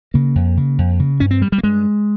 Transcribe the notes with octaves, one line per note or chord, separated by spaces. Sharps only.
C#3 A#3
F2
C#3
F2
C#3
G2 C#4
C4
G3
G3
A#3
G2 G#3